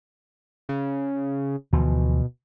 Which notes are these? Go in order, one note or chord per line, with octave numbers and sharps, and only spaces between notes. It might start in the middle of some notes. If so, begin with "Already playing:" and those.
C#3
D2 B2 E3 F3